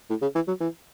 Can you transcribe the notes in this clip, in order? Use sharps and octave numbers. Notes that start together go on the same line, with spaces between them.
A2
C#3
E3
F#3
E3